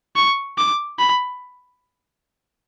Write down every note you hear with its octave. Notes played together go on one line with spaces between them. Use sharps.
C#6
D6
B5